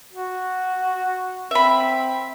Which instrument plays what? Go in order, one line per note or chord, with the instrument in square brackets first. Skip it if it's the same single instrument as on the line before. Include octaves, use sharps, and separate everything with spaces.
[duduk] F#4
[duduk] C4 [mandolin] E5 B5